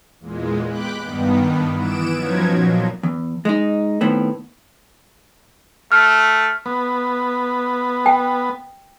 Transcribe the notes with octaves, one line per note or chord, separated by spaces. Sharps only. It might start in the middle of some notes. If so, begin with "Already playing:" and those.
E2 A#2 G#3
G4 G5 B5 D6 F#6
G2 D#3 G3 B3
E3 B3 D7 E7
F3 F#3 B3 C#4 D#4 G#6
A#2 F3 F#3
E2
G#3 D#4
A2 D#3 B3 C4
A3 F6
B3
G5